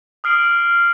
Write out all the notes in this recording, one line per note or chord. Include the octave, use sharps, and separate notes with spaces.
D#6 F6 C7 D7 F#7